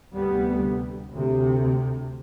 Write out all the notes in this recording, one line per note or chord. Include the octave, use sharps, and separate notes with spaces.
D2 C3 G3 B3
D2 C3